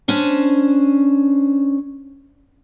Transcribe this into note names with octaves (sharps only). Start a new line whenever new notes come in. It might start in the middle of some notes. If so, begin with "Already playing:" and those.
C#4 D4 C5